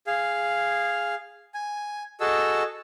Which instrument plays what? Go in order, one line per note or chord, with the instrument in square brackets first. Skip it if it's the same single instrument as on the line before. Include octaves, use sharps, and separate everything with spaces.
[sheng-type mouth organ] G#4 F5
G#5
F#4 G#4 A4 D#5 E6